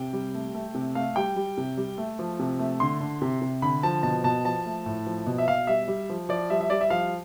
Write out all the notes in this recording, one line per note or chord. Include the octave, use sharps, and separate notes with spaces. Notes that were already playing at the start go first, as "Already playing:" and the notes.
Already playing: C3 G5
G3
A3
A3
C3
A3 F5
G3 G5
G3
C3
G3
A3
F3
C3
A3
D3 C6
D3
C3
C3
D3 B5
F3 A5
B2 A5
B2 A5
F3 A5
A3
A2
F3
B2
E5
B2 F5
G3 E5
G3
F3
F3 D5
G3 E5
E5
G3 D5
E5
F3 F5